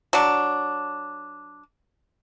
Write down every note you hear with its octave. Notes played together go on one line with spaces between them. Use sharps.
F#3 D4